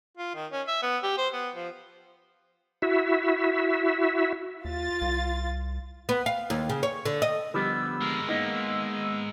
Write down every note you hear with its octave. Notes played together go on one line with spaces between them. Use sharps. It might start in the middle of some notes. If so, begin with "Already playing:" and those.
F4
D#3
C#4
E5
B3
G4
C5
B3
F3
E4 F#4 E5
D#2 F4 A6
C2
B3
F5
D#2
C#3
C#5
D3
D#5
D3 F3 G3 B3 E6
G#3 A#4
A#3 B3 D#4